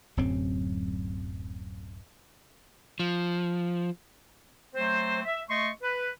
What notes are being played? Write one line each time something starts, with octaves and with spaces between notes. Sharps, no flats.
D1 F#2 F#3 C4
F3
F#3 A3 C4 C5
E5
A3 D#5 C6 C#6
B4